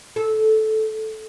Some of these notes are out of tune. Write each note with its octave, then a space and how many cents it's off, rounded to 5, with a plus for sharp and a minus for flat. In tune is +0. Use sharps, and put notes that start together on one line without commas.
A4 -15